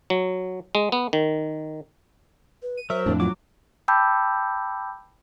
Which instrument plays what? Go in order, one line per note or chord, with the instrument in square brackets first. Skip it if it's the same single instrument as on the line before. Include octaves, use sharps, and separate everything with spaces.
[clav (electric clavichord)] F#3
G#3
B3
D#3
[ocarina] B4
[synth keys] D#7
[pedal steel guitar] F#3 A#4 [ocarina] C5 [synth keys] E5
[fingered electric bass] F2 A2 [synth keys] D4
[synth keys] F#3 [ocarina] F4 [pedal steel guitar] D6
[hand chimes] G5 A5 B5 D6 E6 G6